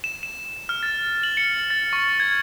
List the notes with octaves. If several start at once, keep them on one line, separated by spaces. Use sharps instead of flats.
E7
E7
F6
A6
F#7
C#7
A6
C#6
G#6